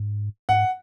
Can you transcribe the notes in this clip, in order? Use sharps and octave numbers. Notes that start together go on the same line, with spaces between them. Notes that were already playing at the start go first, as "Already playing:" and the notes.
Already playing: G#2
G#2 F#5